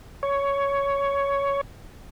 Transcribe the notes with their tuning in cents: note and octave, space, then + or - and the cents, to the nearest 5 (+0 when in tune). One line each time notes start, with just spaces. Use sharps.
C#5 +10